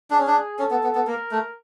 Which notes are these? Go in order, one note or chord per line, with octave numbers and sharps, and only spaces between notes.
D4 G#4
C#4
D4
C#4 A4
B3
B3
B3
A#3 A#4
A3